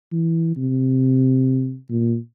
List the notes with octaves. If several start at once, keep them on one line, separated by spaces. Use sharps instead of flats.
E3
C3
A#2